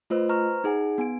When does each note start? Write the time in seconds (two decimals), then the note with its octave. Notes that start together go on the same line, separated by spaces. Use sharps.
0.10 A3 F4 B4 C5 D#5 E6
0.29 B4 C5 A#5 C#6 F6
0.64 D#4 G#4 F#5 G#5
0.98 B3 G#5 D7